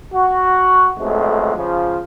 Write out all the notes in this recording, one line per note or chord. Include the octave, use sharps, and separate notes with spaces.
F#4
B1 F2 G#3 A3
C#3 F3